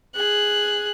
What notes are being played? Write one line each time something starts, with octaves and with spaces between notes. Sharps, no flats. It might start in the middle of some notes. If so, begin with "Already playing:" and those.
G#4 F#6